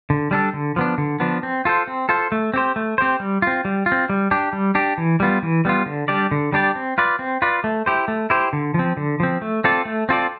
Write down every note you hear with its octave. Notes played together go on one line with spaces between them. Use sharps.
D3
G3 D4 A4
D3
F3 B3 D4
D3
F3 B3 D4
C4
F4 A4 C5
C4
F4 A4 C5
A3
C4 G4 C5
A3
C4 G4 C5
G3
C4 F4
G3
F4
C4
G3
D4 G4
G3
D4 G4
E3
G3 B3 F4
E3
G3 B3 F4
D3
G3 D4 G4 D5
D3
G3 D4 G4 D5
C4
F4 B4 D5
C4
F4 B4 D5
A3
E4 G4 C5
A3
E4 G4 C5
D3
F3 C4
D3
F3 C4
A3
C4 F4 A4 D5
A3
C4 F4 A4 D5